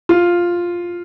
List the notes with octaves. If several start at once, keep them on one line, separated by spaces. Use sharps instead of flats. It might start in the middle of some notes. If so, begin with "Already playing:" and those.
F4